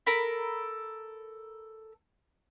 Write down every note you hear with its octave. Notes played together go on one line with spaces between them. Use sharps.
A4 A#4 B5